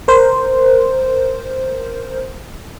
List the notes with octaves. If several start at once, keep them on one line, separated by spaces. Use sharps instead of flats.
A#4 C5